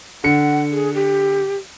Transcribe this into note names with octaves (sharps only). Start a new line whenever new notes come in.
D3 F#5 C#7
G#4
G4